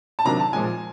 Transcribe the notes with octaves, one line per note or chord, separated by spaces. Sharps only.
A5
C3 D#3 F#3 A#3 D4 A#5
A5
A#2 F3 G#3 G#5